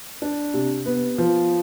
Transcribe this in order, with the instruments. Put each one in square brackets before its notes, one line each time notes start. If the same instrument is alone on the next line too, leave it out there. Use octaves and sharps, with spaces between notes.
[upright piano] D4
C3
B3
F3